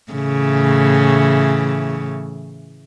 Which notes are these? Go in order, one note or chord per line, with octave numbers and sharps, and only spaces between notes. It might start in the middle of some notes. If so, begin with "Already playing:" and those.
A2 C#3 E3